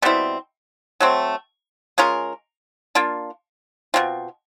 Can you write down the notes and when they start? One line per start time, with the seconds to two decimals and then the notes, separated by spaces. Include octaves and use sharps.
0.02 B2 G3 C4 E4
1.01 F#3 A3 C4
1.98 G#3 C#4 F4 A#4
2.95 A#3 D4 F4
3.94 B2 G3 C4 F4